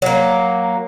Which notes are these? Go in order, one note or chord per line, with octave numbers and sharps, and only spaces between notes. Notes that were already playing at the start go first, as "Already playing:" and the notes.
F#3 A#3